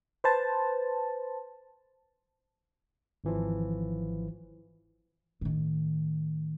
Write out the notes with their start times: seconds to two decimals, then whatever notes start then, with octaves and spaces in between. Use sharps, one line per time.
0.24 B4 C5 A5
3.24 G#1 E3 F3
5.41 A2 D#3